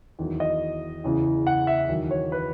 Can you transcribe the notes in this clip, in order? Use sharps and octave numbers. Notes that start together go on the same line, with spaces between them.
E2 D#3 F#3
D#5
E2 C#3 E3
F#5
E5
E2 D#3 F#3
C#5
B4